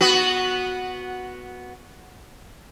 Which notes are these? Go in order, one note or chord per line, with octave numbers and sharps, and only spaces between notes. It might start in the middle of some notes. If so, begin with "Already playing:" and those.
B3 F#4